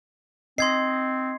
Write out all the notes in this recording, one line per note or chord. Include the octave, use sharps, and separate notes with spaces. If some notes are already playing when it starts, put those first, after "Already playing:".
C4 D#5 C6 G#6 C7